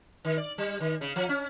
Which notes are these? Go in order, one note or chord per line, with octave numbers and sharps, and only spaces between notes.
D#3
D5
G3
D#3
C#3
F3
C#4